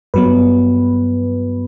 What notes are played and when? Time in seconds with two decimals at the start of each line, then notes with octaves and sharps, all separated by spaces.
0.14 G2 F#3 B3 B4